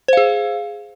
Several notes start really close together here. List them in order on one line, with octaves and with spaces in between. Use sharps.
C5 F5 G#4